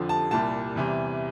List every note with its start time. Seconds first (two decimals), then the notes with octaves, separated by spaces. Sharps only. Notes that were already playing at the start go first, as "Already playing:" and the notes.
Already playing: F2 D3 F3
0.09 A5
0.31 C2 A#2 G3 A5
0.76 E2 C3 E3 G3